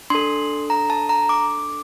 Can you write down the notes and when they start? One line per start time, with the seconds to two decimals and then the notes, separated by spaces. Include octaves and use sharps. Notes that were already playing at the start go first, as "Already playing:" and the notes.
0.10 D4 A4 C6
0.70 A#5
0.90 A5
1.09 A#5
1.29 D6